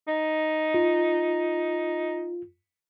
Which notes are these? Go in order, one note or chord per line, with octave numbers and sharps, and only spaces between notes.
D#4
F4